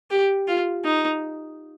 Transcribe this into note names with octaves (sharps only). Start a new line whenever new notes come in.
G4
F4
D#4